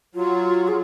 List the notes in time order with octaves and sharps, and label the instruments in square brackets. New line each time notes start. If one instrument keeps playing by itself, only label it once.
[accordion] F#3 [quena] F4
[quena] G#4